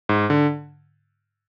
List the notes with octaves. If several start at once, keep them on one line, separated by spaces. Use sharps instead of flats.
G#2
D3